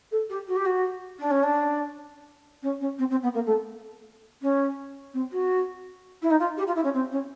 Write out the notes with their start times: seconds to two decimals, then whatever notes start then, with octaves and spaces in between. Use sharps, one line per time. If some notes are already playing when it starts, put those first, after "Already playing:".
0.11 A4
0.29 G4
0.47 F#4
0.56 G4
0.65 F#4
1.19 D4
1.30 C#4
1.42 D4
2.62 C#4
2.80 C#4
2.98 C4
3.09 C4
3.22 B3
3.34 A#3
3.45 A3
4.41 C#4
5.13 C4
5.31 F#4
6.21 E4
6.30 D#4
6.39 F4
6.57 G4
6.66 F4
6.75 E4
6.84 C#4
6.93 C4
7.11 C#4